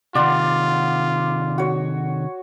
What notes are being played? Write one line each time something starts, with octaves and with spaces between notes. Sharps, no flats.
C3 D#3 F4 D5 F#5 C6
F#4 C#5